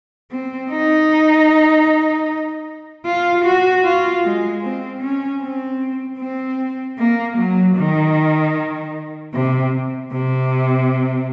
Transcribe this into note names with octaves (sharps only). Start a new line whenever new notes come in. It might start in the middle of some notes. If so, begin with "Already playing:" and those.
C4
D#4
F4
F#4
F4
G#3
C4
C#4
C4
C4
A#3
F#3
D#3
C3
C3